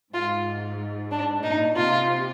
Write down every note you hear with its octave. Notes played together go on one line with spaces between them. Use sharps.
G#2 F4
D4
A#2 D#4
C3 F4